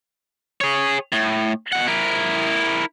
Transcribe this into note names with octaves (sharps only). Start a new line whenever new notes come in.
G#4 C#5
A2
B2 F#5
E4 A#4